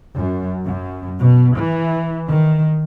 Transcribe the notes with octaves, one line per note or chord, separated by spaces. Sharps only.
F#2
F#2
B2
E3
D#3